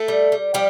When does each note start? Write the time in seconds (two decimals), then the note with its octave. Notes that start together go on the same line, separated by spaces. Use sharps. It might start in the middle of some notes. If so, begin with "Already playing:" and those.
Already playing: A3 A4
0.08 G3
0.32 G3
0.54 F3 G3 G4